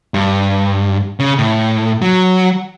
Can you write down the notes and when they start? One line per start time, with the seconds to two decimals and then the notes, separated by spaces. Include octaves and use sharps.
0.14 G2
1.20 C#3
1.39 A2
2.02 F#3